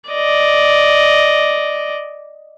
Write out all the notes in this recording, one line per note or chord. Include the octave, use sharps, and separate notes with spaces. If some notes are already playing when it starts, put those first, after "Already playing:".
D5 D#5